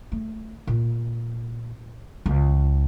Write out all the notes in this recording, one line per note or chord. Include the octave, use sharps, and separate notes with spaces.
A3
A#2
C#2